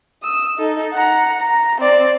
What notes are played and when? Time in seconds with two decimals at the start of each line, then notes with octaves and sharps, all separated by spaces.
0.23 D#6 E6
0.58 D#4 A4
0.94 F#5 A#5
1.40 A#5
1.81 C4 D5